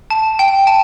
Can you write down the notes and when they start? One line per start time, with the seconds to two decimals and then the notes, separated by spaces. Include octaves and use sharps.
0.10 A5
0.39 G5
0.67 A5